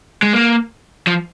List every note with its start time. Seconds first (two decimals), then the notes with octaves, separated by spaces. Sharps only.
0.23 G#3
0.33 A#3
1.07 F3